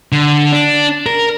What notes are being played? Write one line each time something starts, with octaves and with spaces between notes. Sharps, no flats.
D3
D4
A#4